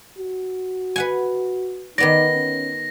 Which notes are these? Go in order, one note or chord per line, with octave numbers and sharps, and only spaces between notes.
F#4
B4 F#5 G#5
D#3 B3 D#4 D5 A#6
C#4